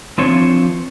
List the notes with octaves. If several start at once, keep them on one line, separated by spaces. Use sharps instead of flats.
E3 F3 C4 D4 F4 C#5